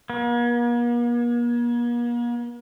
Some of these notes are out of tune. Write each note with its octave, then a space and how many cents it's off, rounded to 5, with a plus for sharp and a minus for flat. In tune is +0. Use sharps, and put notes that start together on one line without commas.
A#3 +45